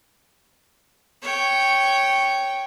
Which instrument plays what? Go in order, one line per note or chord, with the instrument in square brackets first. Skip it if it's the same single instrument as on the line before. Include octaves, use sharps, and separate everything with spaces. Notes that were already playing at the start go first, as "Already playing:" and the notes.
[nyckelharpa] C#5 G5